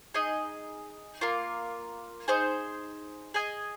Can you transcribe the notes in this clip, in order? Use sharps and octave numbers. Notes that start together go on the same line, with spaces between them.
D#4 G#4 D#5
A#3 F4 A#4
D#4 G#4 C5
G#4 D#5 G#5